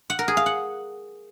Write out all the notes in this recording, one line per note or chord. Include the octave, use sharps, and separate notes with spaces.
F#5
A#4
G#4
F5
F#5